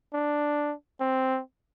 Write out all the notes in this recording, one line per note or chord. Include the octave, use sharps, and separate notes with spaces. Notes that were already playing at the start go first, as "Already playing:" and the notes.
D4
C4